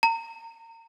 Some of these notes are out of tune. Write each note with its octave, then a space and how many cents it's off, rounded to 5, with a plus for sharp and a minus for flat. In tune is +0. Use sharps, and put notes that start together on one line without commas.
A#5 -35